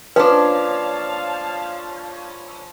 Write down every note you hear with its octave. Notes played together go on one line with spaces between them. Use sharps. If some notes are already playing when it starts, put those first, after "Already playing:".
F3 A#3 C#4 D4 B4 F5 A5